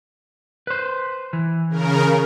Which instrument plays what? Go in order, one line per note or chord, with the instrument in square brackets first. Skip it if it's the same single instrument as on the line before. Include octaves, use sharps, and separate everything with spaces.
[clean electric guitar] B4 C5
E3
[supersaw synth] C#3 A#4